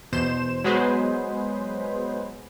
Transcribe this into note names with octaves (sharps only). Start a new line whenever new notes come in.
E2 B2 C5 E7
F#3 G#3 B3 G#4 B4 C5